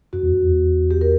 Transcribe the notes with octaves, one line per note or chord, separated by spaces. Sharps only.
F#2 F#4
E2
F#2
E2
G4
A#4